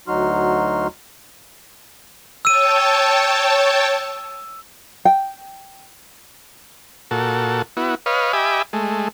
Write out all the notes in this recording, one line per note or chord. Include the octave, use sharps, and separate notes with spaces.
D2 F#3 D#4 F#4 C6 F6
C#5 G5 A5 E6 D#7
G5
A#2 F#4 A4
B3 E4 F#4
B4 C#5 D#5 F5
G4 D#5 E5 G#5 B5 D6
G#3 A3